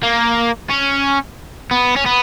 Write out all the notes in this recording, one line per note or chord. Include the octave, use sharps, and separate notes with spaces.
A#3
C#4
B3
C#4
B3